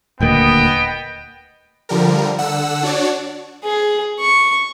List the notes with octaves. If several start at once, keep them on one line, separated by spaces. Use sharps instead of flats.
D#1 D2 A#3 B3 D#5 G5
D3 F3 G3 A#4
D3 F#5 E6
D4 F#4 C#5 D5
G#4
C#6